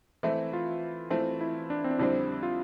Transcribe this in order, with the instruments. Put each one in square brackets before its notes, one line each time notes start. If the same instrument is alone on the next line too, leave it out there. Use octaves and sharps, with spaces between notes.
[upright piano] E3 A3 C4 [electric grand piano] E4
[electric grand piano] F4
[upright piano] E3 A3 C4 [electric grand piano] F4
[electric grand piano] E4
D4
C4
D4
[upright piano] F2 D3 G3 C4 [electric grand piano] E4
[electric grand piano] F4